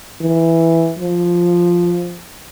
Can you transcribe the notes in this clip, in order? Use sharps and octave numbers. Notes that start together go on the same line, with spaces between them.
E3
F3